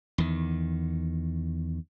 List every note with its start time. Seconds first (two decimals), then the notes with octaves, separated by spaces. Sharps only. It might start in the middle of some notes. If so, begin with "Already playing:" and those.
0.18 E2 D#3